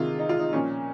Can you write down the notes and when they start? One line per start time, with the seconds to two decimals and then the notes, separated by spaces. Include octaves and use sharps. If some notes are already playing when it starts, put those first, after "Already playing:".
Already playing: C3 D#3 F4 G#4
0.19 D#4
0.29 F4
0.39 D#4
0.53 A#2 F3 C#4